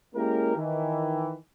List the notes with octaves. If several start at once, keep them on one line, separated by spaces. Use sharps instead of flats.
G#3 A#3 C#4 E4 G4 A#4
D#3 E3